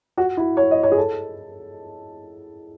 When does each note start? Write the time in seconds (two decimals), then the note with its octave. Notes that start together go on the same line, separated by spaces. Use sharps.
0.17 F#4
0.37 E4
0.57 C#5
0.71 D#5
0.83 C#5
0.92 G#4
0.97 A4